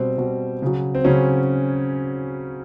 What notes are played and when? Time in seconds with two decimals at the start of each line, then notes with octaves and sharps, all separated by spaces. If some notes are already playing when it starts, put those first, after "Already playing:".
Already playing: B2 G3 C4
0.18 B2 G3
0.62 C#3 F#3
0.95 C4
1.05 C#3 F#3 C#4